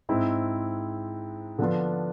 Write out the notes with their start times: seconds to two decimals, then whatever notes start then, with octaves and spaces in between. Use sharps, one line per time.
0.09 G#2 G#3 C4 E4
1.58 D3 F3 B3 D4 F4